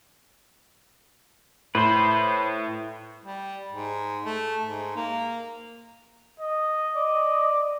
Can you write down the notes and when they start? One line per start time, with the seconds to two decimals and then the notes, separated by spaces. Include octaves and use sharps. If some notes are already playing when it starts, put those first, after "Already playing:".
1.75 A2 B4 C5
3.24 G3
3.72 G#2
4.25 A3
4.65 G#2
4.96 A#3
6.40 D#5
6.96 D5